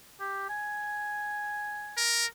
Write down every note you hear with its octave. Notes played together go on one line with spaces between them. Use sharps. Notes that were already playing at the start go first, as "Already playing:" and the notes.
G4
G#5
A#4